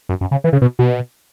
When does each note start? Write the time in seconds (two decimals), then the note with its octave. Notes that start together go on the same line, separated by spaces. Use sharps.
0.09 F#2
0.21 F#2
0.31 C#3
0.44 E3
0.53 C#3
0.62 B2
0.79 B2